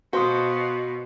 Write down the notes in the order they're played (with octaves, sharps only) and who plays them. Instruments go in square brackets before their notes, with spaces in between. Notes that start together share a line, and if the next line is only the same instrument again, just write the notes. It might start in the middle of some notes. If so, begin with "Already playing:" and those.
[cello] B2 [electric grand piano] F#4 [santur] C5 [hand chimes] F5 C6 D#6